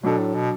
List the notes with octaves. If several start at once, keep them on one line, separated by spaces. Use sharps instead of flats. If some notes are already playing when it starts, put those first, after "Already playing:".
B2 F#3 D4 A4
A2
B2